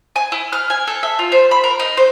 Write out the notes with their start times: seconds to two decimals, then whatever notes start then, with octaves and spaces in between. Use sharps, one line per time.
0.16 G#5
0.32 E4
0.53 F6
0.70 G#5
0.87 A4
1.03 E5
1.19 F4
1.32 C5
1.51 B5
1.64 A#4
1.80 D#4
1.97 C5